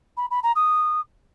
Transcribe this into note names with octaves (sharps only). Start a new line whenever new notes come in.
B5
B5
A#5
D#6